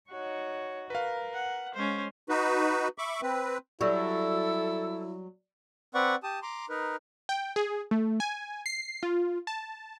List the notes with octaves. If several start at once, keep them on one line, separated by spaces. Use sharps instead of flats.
D#4 F#4 C#5
A#4 B4 F5
F#5
G#3 C#4 C5
D#4 F#4 B4
E5 B5 C#6 D6
C4 B4
F#3 G3 E4 A4
C4 B4 D5 F#5 C#6
G4 A5 D#6
A#5 C6 D6
D#4 A#4 B4
G5
G#4
A3
G#5
C7
F4
A5